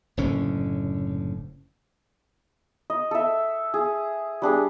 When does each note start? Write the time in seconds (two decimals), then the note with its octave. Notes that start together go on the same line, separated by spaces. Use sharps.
0.17 F#1 A2 D3 C#4
2.90 D#5
3.11 A4 E5
3.74 G#4
4.42 G3 D4 G#4